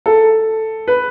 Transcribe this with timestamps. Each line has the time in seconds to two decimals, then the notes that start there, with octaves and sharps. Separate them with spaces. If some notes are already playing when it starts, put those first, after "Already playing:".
0.06 A4
0.88 B4